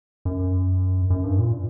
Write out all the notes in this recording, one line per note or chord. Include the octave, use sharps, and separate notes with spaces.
F#2
F#2
G2
A#2